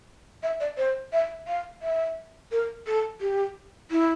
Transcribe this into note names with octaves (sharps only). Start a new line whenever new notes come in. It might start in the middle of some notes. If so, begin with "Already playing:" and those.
E5
D5
C5
E5
F5
E5
A#4
A4
G4
E4